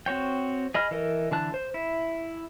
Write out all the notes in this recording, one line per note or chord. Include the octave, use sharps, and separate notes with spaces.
C4 F#4 C#5 G5
G#4 D#5 B5 F6
E3 A4 A#4 D#5
D3 E3 A5 F#6
C5
E4